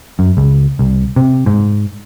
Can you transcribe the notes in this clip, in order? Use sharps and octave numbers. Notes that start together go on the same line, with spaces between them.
F#2
C#2
C2
C3
G#2